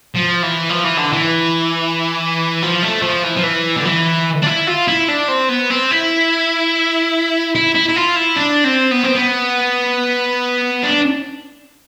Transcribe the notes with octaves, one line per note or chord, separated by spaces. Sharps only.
F3
E3
F3
E3
D3
E3
F3
A3
F3
E3
F3
E3
D3
E3
D4
E4
F4
E4
D4
C4
B3
C4
E4
E4
E4
E4
F4
E4
D4
C4
B3
C4
B3
D4